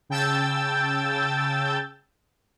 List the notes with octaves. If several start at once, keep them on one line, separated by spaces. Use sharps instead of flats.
C#3 G5 A5 E6 G6 A6